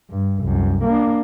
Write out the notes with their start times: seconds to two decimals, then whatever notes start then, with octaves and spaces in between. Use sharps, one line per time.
0.10 G2
0.42 C2 F#2
0.85 A#3 D4